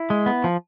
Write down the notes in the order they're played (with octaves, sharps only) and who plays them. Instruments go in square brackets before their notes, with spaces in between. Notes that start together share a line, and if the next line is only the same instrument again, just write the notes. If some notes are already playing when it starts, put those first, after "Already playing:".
Already playing: [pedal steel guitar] E4
G#3
B3
F3